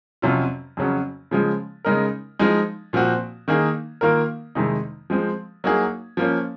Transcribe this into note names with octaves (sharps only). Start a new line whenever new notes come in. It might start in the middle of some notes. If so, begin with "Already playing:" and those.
F2 C3 F#3 C#4 F4
F2 C#3 F#3 C#4
C#3 F3 G#3
C#3 G#3 D#4 A#4
F3 G#3 D#4
A#2 F3 C4 F#4
D#3 A#3 D#4 G#4
D#3 A#3 F4 A#4
F2 C3 D#3 G#3 D#4
F3 G#3 C4
F#3 A#3 D#4 G#4
F3 A#3 C#4